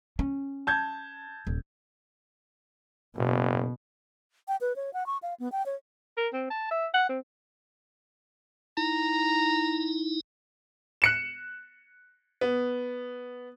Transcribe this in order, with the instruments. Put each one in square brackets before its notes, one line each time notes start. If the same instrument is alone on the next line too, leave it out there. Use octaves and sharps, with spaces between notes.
[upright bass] C#4
[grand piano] A5 G6 G#6
[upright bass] D#1
[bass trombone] F#1 [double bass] B2
[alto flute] G5
B4
C#5
F#5
C#6
F5
B3
G5
C#5
[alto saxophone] A#4
C4
A5
E5
F#5
C4
[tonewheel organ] D#4 E4 [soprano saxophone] A#5
[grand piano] F#6 C#7 E7
B3